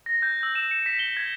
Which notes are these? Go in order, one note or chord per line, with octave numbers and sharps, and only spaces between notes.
A#6
G6
E6
E7
C#7
B6
G7
G#6